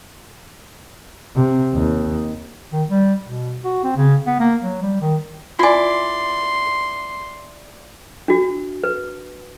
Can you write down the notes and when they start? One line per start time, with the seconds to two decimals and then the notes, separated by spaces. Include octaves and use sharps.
1.36 C3
1.74 D#2
2.73 D#3
2.89 G3
3.24 B2
3.64 F#4
3.84 C4
3.97 C#3
4.27 B3
4.40 A#3
4.62 F#3
4.82 G3
5.01 D#3
5.59 E4 F4 D5 G#5 C6
8.28 D4 F#4
8.84 B4